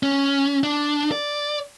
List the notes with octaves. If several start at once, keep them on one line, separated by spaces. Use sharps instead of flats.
C#4
D4
D5